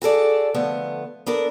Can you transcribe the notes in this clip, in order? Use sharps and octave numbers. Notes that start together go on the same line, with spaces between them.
F#4 G#4 A4 D5
D3 F3 A3 B3
B3 D4 A4 A#4